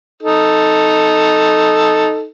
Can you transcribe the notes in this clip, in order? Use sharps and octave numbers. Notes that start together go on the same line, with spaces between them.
D#4 A4